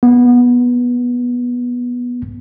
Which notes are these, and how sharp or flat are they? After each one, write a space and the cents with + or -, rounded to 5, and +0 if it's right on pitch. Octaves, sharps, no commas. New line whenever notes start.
B3 -15